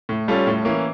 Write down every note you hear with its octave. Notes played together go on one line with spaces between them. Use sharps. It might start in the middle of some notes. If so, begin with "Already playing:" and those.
A2
G3 C#4 F4 A4
A2
E3 A#3 C#4